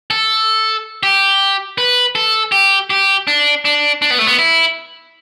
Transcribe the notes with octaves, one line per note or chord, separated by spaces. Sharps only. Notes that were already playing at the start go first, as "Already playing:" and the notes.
A4
G4
B4
A4
G4
G4
D4
D4
D4
B3
A3
B3
E4